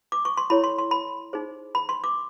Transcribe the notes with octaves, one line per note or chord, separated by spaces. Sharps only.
D6
C#6
C6
E4 A4 C#5 B5
C6
C6
B5
D#4 G#4 C5
B5
C6
D6